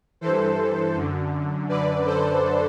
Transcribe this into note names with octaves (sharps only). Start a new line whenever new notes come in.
G2 E3 A4 C5
F#2 D3
F#2 D3 B4 D5
A4 C5